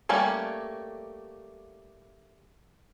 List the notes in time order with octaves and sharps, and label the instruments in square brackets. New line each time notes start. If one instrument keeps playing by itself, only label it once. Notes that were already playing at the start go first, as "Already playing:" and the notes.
[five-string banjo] G3 A3 A#3 C#4